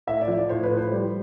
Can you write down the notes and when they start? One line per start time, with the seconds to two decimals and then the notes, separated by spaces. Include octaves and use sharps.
0.07 A2 E5
0.21 D5
0.28 F3
0.35 D5
0.49 A2 C5
0.63 B4
0.71 A2
0.77 C5
0.92 G3